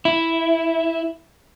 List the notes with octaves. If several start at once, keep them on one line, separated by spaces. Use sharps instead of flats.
E4